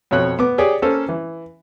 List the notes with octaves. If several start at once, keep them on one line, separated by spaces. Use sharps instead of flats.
F2 B2 C#5 F#6
B3 D6
G4 G#4 C#5 D5
A#3 C#4 A4 A#4 C5
E3